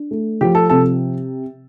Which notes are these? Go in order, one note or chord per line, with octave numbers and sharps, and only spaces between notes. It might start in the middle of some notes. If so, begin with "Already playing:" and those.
Already playing: D4
A3
F3 G4
A4
C3 A4